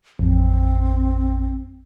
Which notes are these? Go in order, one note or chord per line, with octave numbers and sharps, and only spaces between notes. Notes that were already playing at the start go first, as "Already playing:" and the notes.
A1 F2 C4